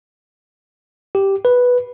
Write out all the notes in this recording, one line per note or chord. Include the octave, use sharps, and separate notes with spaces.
G4
B4